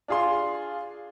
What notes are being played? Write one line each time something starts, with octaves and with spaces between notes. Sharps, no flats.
D4 F4 G#4 F5 C6